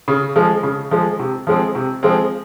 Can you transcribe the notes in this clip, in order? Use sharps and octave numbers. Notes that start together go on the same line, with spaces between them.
C#3
F3 G#3
C#3
F3 G#3
C3
F3 G#3 C4
C3
F3 G#3 C4